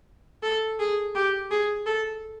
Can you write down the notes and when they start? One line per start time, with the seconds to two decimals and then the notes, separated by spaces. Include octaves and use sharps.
0.43 A4
0.79 G#4
1.15 G4
1.51 G#4
1.86 A4